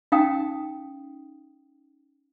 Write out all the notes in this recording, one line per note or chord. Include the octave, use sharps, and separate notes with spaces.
C#4 D#4 F5 G5 A#5 D#6